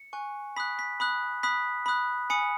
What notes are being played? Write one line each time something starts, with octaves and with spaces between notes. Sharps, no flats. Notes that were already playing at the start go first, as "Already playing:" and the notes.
Already playing: C#7
G#5 C#6 F#6
B5 D#6 F#6 B6
B6
B5 D#6 F#6
B5 D#6 F#6 B6
B5 D#6 F#6
G#5 B5 D#6 C#7